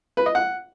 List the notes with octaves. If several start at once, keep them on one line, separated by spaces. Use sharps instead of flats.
B4
D#5
F#5